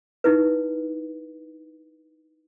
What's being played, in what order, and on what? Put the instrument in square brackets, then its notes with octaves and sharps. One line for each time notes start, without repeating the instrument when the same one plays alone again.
[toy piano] D#4 E4 B4